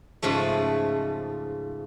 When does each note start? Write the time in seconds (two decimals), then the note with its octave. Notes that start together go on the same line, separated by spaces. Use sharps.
0.22 G#2 C#3 F3 A3